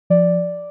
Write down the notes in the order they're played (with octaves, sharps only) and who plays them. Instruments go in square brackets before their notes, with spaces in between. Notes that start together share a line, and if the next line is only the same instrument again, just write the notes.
[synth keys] F3 D5